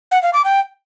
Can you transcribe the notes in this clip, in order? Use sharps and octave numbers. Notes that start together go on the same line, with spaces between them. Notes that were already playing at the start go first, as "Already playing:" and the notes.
F#5
F5
D6
G5